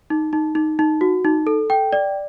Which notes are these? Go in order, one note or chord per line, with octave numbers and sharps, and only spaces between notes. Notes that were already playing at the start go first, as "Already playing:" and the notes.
D#4
D#4
D#4
D#4
F#4
D#4
A4
G5
D5